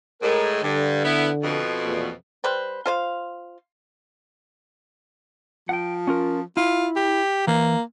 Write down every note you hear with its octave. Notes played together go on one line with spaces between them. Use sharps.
A2 G#3 A#4
G2 D3
B3 E4
F2 B2
E2 A#2
G3 B4 C5
F4 C5 F5
F3 F#5 G5
C#4 F4 A#4
E4 F4
G4
E3 A#3